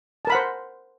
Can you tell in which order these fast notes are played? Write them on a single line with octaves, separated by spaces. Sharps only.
A5 A#4 B5 F#5 C5